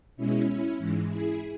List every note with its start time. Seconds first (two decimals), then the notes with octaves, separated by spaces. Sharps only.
0.16 B2 G#3 C#4 E4
0.78 G#2 E3 G#3
1.08 E4 G#4